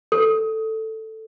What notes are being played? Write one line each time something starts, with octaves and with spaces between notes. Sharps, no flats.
A4